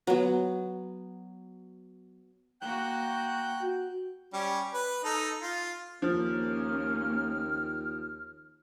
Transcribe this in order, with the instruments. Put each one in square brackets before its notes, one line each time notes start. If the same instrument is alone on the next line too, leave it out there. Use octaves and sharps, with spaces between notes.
[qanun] F#3 B3
[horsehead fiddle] A#3 F#4 [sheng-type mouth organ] G5 F#6 G6
[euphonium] F#4
[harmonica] G3 C#4
B4
D#4 A4
F4
[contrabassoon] D#2 [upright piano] F3 [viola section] A#3 C#4 [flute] F6